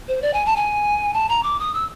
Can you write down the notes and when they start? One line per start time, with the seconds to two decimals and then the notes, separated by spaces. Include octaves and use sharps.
0.08 C5
0.22 D5
0.34 G#5
0.46 A5
0.56 G#5
1.14 A5
1.29 A#5
1.43 D6
1.60 D#6
1.74 E6